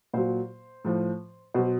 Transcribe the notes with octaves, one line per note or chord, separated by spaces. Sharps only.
A#2 F#3 C5
A2 F3
B2 F#3 C5